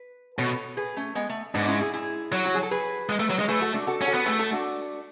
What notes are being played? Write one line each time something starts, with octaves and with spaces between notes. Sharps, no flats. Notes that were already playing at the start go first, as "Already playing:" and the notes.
Already playing: B4
B2 A4 C#5
G#4 B4
A3 C#4
G#3 B3
A3
G#2 B3 D4
C#4 E4
E4 G#4
E4 G#4
F#3
F#4
G#4
A4
G#4 B4
G#3
A3
F#3
G#3
C#5
A3 G#4 B4
F#4 A4
D4 F#4
F#4 A4
C#4
F#4 A4
B3
A3 G#4 B4
F#4 A4
D4 F#4